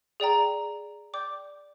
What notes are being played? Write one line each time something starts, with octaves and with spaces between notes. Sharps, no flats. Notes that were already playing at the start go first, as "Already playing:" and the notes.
G#4 D5 G5 A#5
D5 G5 D6 G6